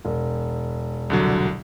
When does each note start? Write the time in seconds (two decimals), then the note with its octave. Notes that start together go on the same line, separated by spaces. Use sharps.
0.05 E1
1.10 C2 D3 F#3